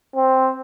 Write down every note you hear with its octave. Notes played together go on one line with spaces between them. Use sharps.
C4